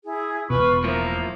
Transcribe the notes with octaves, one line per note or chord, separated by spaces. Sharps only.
E4 G#4
E1 B2 F4 B4 B5 C#6
A2 F3 A#3 A#4 E5